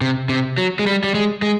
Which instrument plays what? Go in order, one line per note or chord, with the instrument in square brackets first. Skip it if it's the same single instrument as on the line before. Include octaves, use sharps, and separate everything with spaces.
[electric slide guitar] C3
C3
F#3
G#3
G3
G3
G#3
G#3